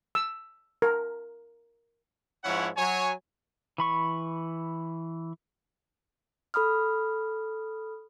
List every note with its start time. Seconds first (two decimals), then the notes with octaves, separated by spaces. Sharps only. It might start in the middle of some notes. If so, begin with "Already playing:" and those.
0.15 E6
0.82 A#4
2.44 G#2 F3 C#4 E4 C#5 F#5
2.77 F#3 C#5 G#5
3.78 E3 B5 C#6
6.54 A4 B5 D#6 F6